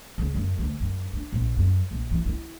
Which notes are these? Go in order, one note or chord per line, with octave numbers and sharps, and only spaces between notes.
C#2
F#2
D2
F#2
D4
A#1
F#2
A#1
E3
E4